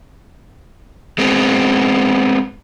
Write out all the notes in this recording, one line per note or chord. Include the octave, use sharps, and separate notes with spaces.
G#3 B3 C4